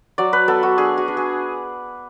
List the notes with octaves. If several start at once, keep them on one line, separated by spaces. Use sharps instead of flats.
F#3 D5
B4
B3 A4
F#4
D4 G#4
F#4
D4
G#4